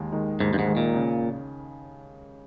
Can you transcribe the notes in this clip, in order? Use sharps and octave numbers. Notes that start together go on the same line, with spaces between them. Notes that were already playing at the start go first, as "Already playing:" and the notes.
Already playing: D#2 D#3 G#3 D#4
D#3 G#3 D#4
D#2 G#2
G2
G#2
D#3 G#3 D#4
A#2
C#3